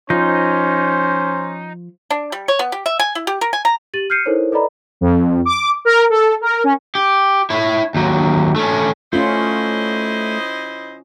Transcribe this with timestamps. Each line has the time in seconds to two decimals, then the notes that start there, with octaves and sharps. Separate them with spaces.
0.10 F3 C#4 D#4 C5
2.10 D4
2.32 G3
2.48 C#5
2.59 B3
2.72 G4
2.86 E5
2.99 G#5
3.15 E4
3.27 G4
3.41 A#4
3.53 G#5
3.65 A#5
3.94 G4 A6 D#7 F#7
4.10 F6 G6 C7 C#7 D#7
4.26 D#4 E4 A4 A#4 C5 C#5
4.52 A4 B4 D5 D#5 A#5 B5
5.01 F2
5.45 D6
5.85 A#4
6.10 A4
6.41 A#4
6.64 C#4
6.95 G4
7.50 E4 C#5
7.94 D#2 F#3
8.56 A3 C#4
9.13 A3 C#4 E4 F4 C5 D#5